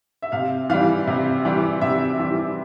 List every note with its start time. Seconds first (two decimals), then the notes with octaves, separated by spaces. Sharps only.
0.22 E5
0.32 C3 F5
0.70 E3 G3 F5
1.07 C3
1.45 E3 G3
1.81 C3 E5
2.19 E3 G3